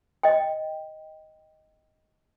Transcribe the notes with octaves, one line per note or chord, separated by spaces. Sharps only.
D#5 G5